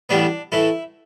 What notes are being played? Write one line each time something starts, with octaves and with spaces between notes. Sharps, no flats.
A1 A2 G3 B3 D4
A2 E3 A3 E4